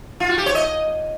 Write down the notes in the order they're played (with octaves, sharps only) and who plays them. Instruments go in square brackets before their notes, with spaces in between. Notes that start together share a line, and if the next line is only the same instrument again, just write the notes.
[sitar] F4
F#4
G4
C#5
D#5